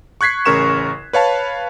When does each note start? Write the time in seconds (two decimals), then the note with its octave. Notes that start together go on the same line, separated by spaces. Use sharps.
0.21 C#6 F#6 G#6 B6 C7
0.46 A1 C#3 A#4 C#6 E7
1.13 B4 C#5 F5 A5 B5